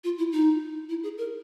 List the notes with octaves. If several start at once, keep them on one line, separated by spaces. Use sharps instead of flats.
F4
E4
D#4
E4
G#4
A#4